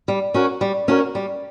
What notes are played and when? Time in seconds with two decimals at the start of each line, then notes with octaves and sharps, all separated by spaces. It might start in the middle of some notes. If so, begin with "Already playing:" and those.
0.08 G3
0.34 C#4 F#4 A#4
0.61 G3
0.88 C#4 F#4 A#4
1.15 G3